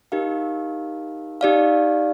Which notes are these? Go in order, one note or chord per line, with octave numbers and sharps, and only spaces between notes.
D#4 G4 A#4 F5
D#4 G4 D5 F5